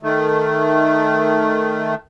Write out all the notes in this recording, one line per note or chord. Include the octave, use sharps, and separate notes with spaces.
D#3 A3